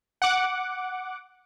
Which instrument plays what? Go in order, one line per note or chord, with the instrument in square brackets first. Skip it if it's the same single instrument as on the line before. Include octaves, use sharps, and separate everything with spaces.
[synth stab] F#5 D6